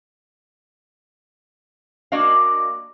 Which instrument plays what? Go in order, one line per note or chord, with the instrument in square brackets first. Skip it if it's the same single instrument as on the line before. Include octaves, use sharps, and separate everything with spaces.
[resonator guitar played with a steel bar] A#3 D4 F#4 D5 D#5 F5